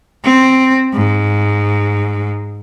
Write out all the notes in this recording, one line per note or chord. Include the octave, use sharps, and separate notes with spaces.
C4
G#2